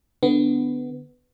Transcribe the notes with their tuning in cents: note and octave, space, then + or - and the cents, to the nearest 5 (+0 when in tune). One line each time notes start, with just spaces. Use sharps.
D3 +0 B3 +10